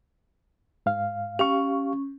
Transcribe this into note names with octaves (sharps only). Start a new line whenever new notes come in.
G#2 F5
C#4 G4 F5 C#6